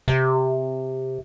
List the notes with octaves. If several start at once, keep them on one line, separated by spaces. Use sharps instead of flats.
C3